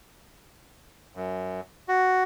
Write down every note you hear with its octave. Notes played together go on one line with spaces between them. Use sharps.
F#2
F#4